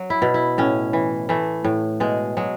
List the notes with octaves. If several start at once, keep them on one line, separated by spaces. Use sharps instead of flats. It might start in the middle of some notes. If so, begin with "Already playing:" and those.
Already playing: F#3
E4
B2
E4
A2 C#4
E3
E3 A3
A2
B2 G#3
F#3 G#3